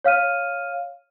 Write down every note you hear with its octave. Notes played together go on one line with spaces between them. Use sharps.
C#5 F5 F6 D#7